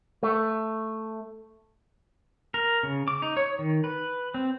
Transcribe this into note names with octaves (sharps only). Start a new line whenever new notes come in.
A3
A#4
C#3
D6
D#4
C#5
D#3
B4
C4